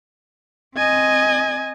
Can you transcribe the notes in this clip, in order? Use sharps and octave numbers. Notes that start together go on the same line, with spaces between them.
C4 D#5 G#5